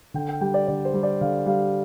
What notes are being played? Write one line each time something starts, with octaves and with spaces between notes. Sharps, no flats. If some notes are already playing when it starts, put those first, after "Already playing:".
D3 G5
G5
G3 G5
D5
D3 D5
C5
G3
D5
D3 F5
G3 F5